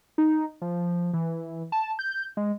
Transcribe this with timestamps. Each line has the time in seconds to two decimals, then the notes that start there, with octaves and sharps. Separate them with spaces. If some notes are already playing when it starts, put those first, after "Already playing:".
0.18 D#4
0.62 F3
1.13 E3
1.72 A5
1.99 G6
2.37 G#3